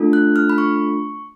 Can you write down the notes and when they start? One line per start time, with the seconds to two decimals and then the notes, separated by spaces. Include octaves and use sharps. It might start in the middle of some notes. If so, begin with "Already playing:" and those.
Already playing: A3 D4 F4 A4
0.13 F#6
0.36 F6
0.50 B5
0.58 C#6